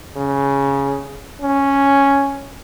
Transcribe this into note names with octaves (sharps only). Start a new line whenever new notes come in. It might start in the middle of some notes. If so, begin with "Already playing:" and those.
C#3
C#4